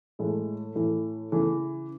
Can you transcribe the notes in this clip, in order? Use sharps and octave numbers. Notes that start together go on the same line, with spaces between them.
A2 E3 G#3
A2 E3
C#3 E3 A3